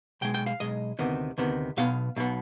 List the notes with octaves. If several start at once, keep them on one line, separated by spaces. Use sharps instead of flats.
B1 B2 G#3 G5
G5
F5
B1 B2 G#3 D#5
D2 C3 D#3 B3
D2 C3 D#3 B3
B1 B2 B3 F5
B1 B2 B3